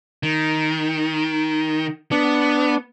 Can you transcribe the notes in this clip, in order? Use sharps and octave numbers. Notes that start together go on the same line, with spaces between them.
D#3
B3 D4